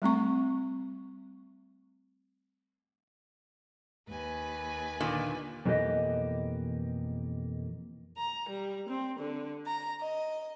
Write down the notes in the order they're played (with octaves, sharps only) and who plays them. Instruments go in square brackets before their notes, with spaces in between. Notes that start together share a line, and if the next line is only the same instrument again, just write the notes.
[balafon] G3 A3 C4 C#6
[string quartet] D#2 B4 G#5
[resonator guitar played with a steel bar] A#2 D3 D#3
[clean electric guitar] F2 B2 E3 A#3 G4 D#5
[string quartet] A#5
G3
C4
D3
A#5
D#5